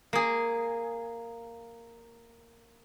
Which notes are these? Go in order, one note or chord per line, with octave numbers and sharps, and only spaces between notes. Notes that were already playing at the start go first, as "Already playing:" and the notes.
A#3 G#4